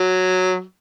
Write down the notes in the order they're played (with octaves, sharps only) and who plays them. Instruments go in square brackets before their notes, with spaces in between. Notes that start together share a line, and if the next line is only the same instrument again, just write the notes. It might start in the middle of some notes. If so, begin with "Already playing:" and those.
Already playing: [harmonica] F#3